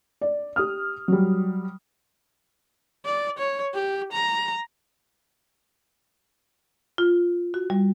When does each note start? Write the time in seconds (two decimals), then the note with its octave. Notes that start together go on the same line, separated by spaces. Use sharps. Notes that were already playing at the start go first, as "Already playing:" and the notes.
0.21 D5
0.56 G4 D#6 F6
1.08 F#3 G3
3.05 D5
3.38 C#5
3.74 G4
4.13 A#5
6.98 F4
7.54 F#4
7.70 G3